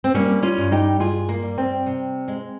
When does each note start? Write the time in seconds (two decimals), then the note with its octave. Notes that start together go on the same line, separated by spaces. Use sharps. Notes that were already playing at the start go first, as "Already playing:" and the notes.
0.04 C4
0.14 G3 A#3 C#4
0.43 C#4 F4
0.58 G2
0.72 D#4 G4
1.00 G2 F4 G#4
1.29 A#3
1.43 G3
1.58 C4
1.86 C3
2.28 G#3